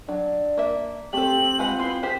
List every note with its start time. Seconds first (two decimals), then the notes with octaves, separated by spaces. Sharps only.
0.09 F#3 D4
0.57 A#3 E5
1.13 A3 C4 G4 A4 F#7
1.59 G#3 F4 B4 F#5
1.79 B3 E4 C6
2.03 G4 G#4 C5 B6